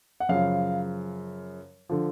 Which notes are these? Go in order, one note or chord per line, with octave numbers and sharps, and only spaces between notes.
F#5
F#2 C#3 F3 F5
D3 F3